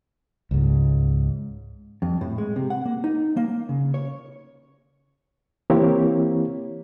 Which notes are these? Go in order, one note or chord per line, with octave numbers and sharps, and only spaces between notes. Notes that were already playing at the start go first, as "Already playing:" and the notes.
C#2 G#2
F2
A2
G#3
C3
F#5
A#3
D#4
A#3
C#3
C#5
E3 A#3 C4 E4 G4 C#5